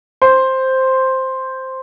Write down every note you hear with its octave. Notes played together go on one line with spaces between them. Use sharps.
C5